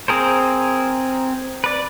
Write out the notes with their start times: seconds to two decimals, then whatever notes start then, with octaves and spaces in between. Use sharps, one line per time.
0.08 C4 G#4 A#4 C5
1.64 B4 D5